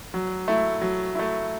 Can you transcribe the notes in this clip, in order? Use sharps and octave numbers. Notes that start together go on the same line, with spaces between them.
F#3
A3 E4
F#3
A3 E4